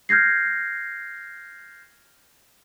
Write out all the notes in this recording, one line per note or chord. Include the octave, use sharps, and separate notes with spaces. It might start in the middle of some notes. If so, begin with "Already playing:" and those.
F6 G6 G#6 A#6 C7